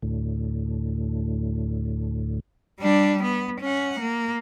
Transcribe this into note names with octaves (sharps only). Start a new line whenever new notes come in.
D2 A2
G3 D4
B3
C#4 F#5
A#3